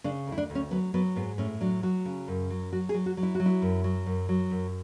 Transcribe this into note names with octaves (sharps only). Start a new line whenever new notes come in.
C#3 D4
D2 E4
D4
D2
C#4
F#3 B3
F#3 B3
G#2 B3
A2 C#4
F#3 D4
F#3 F#4
C#3
F#2
F#3
F#3 F#4
G#4
F#3
F#4
F#3
E4
F#4
F#3
E4
F#2
F#3
F#2
F#3
F#2